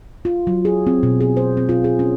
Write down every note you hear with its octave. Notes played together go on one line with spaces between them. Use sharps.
F4
F#3
G#4
C4
B2
G#4
C5
C4
F4
G#4
C#4